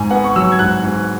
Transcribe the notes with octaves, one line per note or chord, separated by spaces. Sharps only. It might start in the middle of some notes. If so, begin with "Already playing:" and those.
Already playing: G#2 G#5
B3 F#5
C#6
F#3 E6
G#6
G#2 F#6
G#2